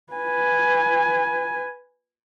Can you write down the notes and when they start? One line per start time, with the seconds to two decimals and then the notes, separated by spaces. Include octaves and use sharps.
0.13 B4 G#5